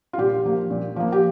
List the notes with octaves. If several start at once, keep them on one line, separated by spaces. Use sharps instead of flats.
F4
A#2 G4
F3 A#3
A#2
F3 A#3
G4